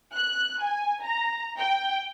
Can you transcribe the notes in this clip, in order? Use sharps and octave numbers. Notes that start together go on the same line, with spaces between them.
F#6
G#5
A#5
G5